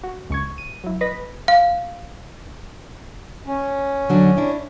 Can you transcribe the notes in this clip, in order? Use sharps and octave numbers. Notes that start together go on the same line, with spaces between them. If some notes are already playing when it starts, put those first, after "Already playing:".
F#4
C#2 C#6 G#6
D#7
F#3 E4
B4 D#5 B5 A#6 B6
F5
C#4
D3 F#3 D4
D4 E4